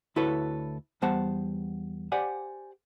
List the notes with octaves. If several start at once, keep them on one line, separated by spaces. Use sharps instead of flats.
D2 E4 F#4 A4 B4 C#5
E2 G3 B3 C5 F#5 A5
G4 C5 D5 F#5 G#5